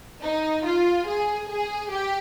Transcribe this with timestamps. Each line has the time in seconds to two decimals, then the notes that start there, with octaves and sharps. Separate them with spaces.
0.22 D#4
0.65 F4
1.06 G#4
1.49 G#4
1.90 G4